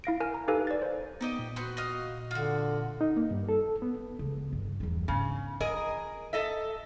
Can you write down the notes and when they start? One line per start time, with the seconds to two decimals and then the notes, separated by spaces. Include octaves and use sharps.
0.04 E4 F5 A#6 D7
0.20 A#4 G#5 F6
0.34 A#5
0.48 D#4 G4 A4 B4 F5 G#5
0.67 D5 A6
0.82 C5
1.21 B3 D#4 G4 D#5
1.39 A#2
1.56 D#4 F#4 B4 C5
1.77 D#5 F5 D#6
2.31 D3 F4 F#4
3.01 D#4
3.17 A#3
3.31 G2
3.49 A4
3.82 B3
4.19 C#2
4.52 G1
4.80 E2 G2
5.08 G#2 C#3 B3
5.60 F4 G#4 A#4 D#5
6.33 A4 D#5 E5